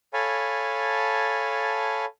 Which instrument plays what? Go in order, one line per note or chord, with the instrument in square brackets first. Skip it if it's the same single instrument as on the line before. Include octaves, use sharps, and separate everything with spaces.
[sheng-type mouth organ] A4 C#5 F5 G#5 A5 B5